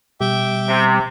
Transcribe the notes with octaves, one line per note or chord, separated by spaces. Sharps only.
B2 G3 E5 G5 D6
C3